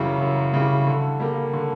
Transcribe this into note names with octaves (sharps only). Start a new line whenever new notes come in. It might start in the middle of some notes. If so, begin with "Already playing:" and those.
Already playing: F#2 C#3 E3 G3
F#2
C#3 E3 G3
D3
G3 A#3
D3